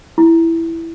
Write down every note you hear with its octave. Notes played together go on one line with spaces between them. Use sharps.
E4